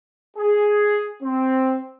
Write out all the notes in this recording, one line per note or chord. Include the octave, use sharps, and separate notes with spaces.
G#4
C4